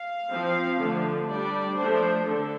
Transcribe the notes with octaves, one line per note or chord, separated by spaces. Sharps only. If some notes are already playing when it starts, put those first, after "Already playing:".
Already playing: F5
F3 C4
D3 F3 A3 D4
G3 D4 D5
F3 A3 D4 C5
D3 A4